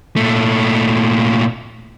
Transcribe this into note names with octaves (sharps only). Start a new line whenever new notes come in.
A#2 A3